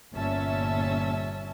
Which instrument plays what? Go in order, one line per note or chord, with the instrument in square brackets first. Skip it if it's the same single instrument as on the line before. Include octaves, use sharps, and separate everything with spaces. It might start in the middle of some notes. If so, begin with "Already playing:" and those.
[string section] G1 A#2 C#4 E5 A5